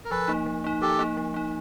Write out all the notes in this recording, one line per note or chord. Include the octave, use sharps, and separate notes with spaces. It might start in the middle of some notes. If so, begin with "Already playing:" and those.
A#4
F3 A4 B4
A#3 D#4
F3
A#3 D#4
F3 G4 A4
A#3 D#4
F3
A#3 D#4